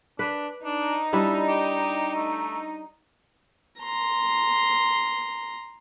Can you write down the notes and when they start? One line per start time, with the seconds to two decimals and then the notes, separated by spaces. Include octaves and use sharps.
0.19 D4 B4
0.65 D4 D#4
1.13 G3 D4 E4 E5
1.48 G4
2.16 A3
3.80 A#5 C6